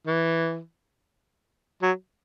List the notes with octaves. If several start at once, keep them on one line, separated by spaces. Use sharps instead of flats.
E3
F#3